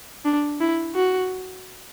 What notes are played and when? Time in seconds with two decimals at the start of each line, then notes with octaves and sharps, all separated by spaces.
0.25 D4
0.60 E4
0.95 F#4